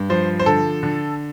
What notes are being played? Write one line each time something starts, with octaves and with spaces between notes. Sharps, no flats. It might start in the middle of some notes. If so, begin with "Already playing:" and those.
Already playing: G2
F3 C5
C5
D3 A4
D3